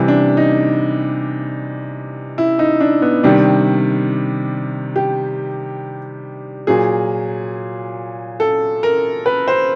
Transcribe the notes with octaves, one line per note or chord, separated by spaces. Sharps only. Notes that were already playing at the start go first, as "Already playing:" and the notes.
Already playing: C3 E3 G3
D4
D#4
E4
D#4
D4
B3
C3 D#3 G3 D4
G4
A#2 F#3 G#4
A4
A#4
B4
C5